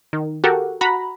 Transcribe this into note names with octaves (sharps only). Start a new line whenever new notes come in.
D#3
F#4 G4 A4 A#4
F#4 A#5 B5